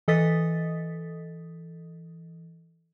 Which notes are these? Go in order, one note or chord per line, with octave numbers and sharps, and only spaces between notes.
E3 A4 D#5 D#6 A6 B6